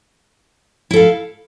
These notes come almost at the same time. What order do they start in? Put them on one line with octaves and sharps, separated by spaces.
E4 A4 F5